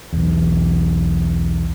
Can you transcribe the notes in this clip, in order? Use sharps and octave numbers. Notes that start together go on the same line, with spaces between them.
B1 E2